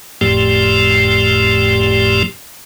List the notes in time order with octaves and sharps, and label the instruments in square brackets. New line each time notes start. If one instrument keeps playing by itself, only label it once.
[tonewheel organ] G1 F2 A2 F3 A3 G4